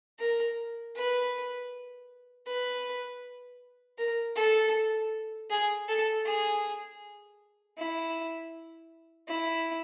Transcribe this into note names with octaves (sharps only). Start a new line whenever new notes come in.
A#4
B4
B4
A#4
A4
G#4
A4
G#4
E4
E4